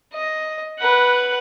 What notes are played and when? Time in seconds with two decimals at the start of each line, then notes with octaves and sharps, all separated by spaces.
0.14 D#5
0.79 B4 F#5